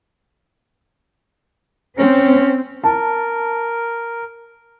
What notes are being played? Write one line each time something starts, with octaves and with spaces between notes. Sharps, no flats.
C4 C#4
A#4 A5